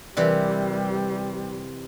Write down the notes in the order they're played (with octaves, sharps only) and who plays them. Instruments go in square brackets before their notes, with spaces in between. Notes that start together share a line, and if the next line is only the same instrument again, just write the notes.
[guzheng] C3 E3 G4 [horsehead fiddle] G3 [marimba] A#4 B4 D5